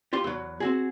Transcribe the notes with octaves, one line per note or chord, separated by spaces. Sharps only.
F4 G4 C6
E2 F#3
C4 F#4 G#4